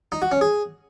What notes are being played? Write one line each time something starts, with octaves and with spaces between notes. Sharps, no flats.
D#4
F#4
C#4
G#4